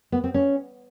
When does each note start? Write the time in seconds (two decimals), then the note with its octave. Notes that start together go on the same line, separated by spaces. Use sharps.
0.12 B3
0.24 C4
0.34 C#4